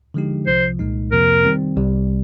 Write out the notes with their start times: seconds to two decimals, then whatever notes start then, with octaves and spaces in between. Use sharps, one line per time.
0.14 D3 F3 G#3 D#4 G4
0.47 C2 C3 F3 C5
0.79 C2 A#2 G#3 D#4
1.12 F2 C3 F3 A#3 A#4
1.44 D#3 G3 C4
1.77 C2 C3 G3